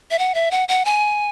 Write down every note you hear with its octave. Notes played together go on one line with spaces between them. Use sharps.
E5
F#5
E5
F#5
F#5
G#5